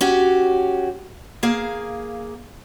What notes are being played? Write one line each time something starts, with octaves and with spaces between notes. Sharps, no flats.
C#4 F#4 G4
A#3 G#4 F5